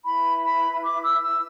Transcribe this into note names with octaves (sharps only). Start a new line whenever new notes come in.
E4 B4 B5
B5
D6
E6
E6